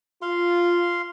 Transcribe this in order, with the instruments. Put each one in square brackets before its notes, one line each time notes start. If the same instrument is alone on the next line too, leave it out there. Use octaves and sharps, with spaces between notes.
[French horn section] F4 [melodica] F5 C6